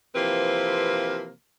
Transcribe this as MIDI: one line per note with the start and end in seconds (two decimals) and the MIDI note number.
0.15 1.30 48
0.15 1.30 52
0.15 1.30 53
0.15 1.30 58
0.15 1.30 60
0.15 1.30 71